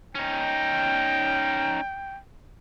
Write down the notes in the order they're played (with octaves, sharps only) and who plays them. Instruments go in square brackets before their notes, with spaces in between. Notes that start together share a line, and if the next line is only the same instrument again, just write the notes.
[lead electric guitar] C#4 D#4 [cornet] G5